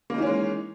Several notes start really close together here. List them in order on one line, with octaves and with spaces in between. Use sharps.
A#3 D#4 E3 C#4 G#3